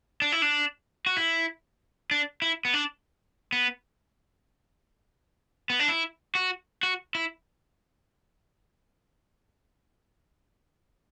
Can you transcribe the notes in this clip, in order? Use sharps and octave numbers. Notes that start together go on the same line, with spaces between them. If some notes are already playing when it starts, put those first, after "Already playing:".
D4
E4
D4
F#4
E4
D4
E4
B3
D4
B3
B3
D4
E4
F#4
F#4
E4